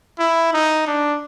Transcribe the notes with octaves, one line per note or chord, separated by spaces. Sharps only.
E4
D#4
D4